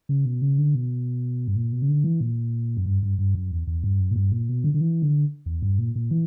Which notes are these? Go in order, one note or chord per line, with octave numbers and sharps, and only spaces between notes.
C#3
B2
C#3
D3
B2
G2
A#2
B2
C#3
D3
E3
A#2
F#2
G2
G2
G2
F#2
E2
E2
G2
F#2
A#2
G2
A#2
B2
D3
D3
E3
D3
E2
G2
A#2
A#2
E3